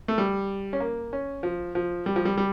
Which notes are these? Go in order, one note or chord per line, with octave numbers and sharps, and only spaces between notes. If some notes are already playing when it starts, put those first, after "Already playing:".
A3
G3
C#4
A#3
C#4
F3
F3
G3
F3
G3
G3